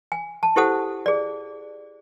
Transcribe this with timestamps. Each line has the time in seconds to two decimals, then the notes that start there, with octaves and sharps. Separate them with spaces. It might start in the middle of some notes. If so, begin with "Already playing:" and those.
0.12 G#5
0.43 A5
0.56 E4 G4 A4 C5 F#5 D#6
1.06 G#4 D5